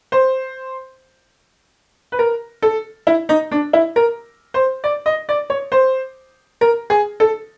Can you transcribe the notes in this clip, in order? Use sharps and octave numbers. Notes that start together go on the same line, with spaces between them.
C5
B4
A#4
A4
E4
D#4
D4
E4
A#4
C5
D5
D#5
D5
C#5
C5
A#4
G#4
A4